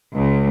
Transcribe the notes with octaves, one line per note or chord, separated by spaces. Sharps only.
C#2